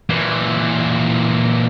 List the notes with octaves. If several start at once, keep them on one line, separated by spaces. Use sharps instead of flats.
A#2 E3